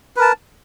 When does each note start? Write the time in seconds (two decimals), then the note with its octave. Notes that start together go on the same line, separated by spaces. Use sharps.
0.16 B4
0.19 A#4
0.22 A5